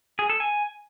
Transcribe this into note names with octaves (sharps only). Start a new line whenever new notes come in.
G#4
A4
G#5